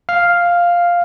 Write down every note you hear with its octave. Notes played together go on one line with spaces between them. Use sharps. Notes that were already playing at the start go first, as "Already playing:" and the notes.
F5